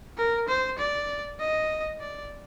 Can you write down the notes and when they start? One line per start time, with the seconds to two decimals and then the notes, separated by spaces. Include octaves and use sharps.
0.18 A#4
0.48 C5
0.79 D5
1.40 D#5
2.01 D5